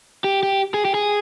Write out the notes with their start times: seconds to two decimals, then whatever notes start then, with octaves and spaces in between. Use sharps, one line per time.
0.24 G4
0.43 G4
0.74 G#4
0.85 G4
0.94 G#4